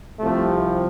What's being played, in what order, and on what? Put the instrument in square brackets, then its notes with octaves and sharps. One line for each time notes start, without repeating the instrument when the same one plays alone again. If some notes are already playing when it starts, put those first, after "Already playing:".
[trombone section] C2 C3 F3 A3